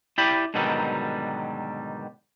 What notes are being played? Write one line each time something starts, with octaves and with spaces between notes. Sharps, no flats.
E4 G4 D5 G5 B5
G#2 B2 D3 D#3 F#3 G3